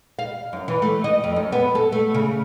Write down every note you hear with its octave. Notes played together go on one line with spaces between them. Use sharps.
F5
F#2
E3
A3
D#5
F2
F#2
B3
A4
A3
C#3